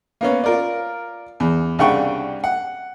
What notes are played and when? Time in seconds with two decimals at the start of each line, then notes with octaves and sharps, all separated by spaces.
0.21 A#3 B3 C#4
0.44 F4 A#4 D5
1.40 E2
1.79 C2 C#3 D4 F#5 G5 C#6
2.44 F#5